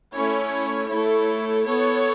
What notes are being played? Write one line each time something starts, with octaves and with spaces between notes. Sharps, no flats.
A3 C#4 E4 C#5
A3 E4 A4 C#5
B3 A4 C#5